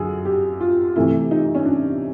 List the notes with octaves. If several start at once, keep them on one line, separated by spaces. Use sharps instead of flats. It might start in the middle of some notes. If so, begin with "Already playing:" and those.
Already playing: F#2 D3 F#3 G#4
G4
F4
C3 E3 A3 C4 E4
D#4
C#4
D4